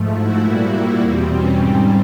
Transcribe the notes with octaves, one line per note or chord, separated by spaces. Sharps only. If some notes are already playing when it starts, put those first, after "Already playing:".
Already playing: G#2 F3 A3
E4 F#4
A#2 G3 A#3
E2 B2 G3 C4
C#4
G#2 D#3 G3 C4